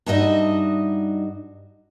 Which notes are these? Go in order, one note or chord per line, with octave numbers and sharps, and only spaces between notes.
G2 D#4 F#4 D#5 E5